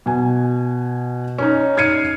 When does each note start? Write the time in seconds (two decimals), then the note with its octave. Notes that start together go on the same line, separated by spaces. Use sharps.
0.06 B2 G#5
1.38 C#4 D#4
1.77 F6 G#6 C7 C#7 D#7